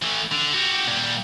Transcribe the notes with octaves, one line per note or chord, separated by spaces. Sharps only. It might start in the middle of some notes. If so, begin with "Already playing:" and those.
E3 A3
D3
F#4 G4
A#2 G3